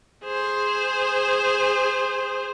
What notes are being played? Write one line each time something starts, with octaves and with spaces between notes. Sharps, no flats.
G#4 C5